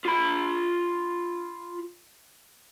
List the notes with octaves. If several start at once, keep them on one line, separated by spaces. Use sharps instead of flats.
F4 B5